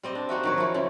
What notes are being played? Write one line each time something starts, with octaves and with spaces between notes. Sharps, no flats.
G3 C4 D#5
D4
C4 D#4 F#4 E5
D#3 F#3 C#5
F3 E4
C#3 E4